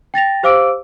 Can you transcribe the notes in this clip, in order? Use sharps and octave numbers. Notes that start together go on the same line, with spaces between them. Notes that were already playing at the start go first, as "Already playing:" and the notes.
G5 A6 A#6 F7
G4 C5 F5 D6 E6 D7